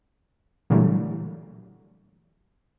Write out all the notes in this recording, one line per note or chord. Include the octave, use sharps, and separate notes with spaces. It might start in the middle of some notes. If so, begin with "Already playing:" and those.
A#2 D3 E3 F#3 G3 A3